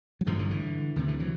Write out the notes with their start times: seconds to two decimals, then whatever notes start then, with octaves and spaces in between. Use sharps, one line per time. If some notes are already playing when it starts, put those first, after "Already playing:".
0.21 F#3
0.27 A1 G2 D3 D#3 F3
0.39 D3 E3
0.50 D3 E3
0.96 D2 C3 D#3
1.08 D3 E3
1.20 E3 F#3